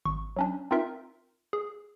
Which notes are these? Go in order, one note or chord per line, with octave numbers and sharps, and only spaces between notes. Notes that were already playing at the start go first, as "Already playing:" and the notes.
G#1 C#6
F#3 C#4 D4
C4 D#4 F4 A#4 E5
G#4